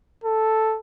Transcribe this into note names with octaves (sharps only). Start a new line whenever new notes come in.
A4